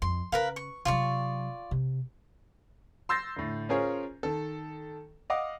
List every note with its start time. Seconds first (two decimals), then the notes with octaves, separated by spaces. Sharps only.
0.02 F2 C6
0.32 C#3 A#4 B4 F5
0.56 C#6
0.85 C3 F#3 F4 D5 C#6
1.71 C3
3.09 C6 E6 G6 A6 A#6 C7
3.36 A2 D3
3.69 C#4 F4 G#4 A#4 C5 C#5
4.23 D#3 A4
5.30 D#5 F5 F#5 D6 D#6